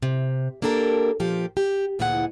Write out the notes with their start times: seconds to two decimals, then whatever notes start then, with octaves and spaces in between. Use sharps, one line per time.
0.02 C3
0.62 A#3 D4 G4 A4 A#4
1.20 A#2 F3 G4
1.57 G4
1.99 D2 A#2 E3 G#3 G#4 F#5